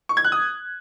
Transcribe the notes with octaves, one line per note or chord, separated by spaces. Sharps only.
C#6
G#6
F#6
D#6